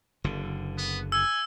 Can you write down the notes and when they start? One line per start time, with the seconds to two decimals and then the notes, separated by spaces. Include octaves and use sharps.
0.24 F#1 D3
0.78 B3
1.12 G#5 E6